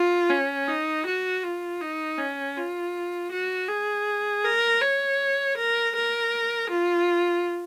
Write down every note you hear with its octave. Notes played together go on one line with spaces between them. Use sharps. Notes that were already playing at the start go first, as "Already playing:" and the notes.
Already playing: F4
C#4
D#4
F#4
F4
D#4
C#4
F4
F#4
G#4
A#4
C#5
A#4
A#4
F4